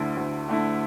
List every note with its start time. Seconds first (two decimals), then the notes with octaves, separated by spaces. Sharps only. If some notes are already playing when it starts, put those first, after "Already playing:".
Already playing: D2 D3 A3 E4
0.17 D2
0.49 D3 A3 E4